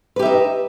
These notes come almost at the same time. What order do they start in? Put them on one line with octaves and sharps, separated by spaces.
B4 G4 E5 D#4